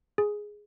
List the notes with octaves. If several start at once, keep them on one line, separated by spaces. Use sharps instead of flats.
G#4